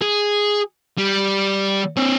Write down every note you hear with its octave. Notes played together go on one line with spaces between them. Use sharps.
G#4
G3
C4 C#5